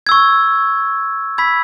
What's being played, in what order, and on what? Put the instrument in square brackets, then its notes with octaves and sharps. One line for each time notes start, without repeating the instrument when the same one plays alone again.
[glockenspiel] C#6 E6 G#6
B5 E6 G#6 B6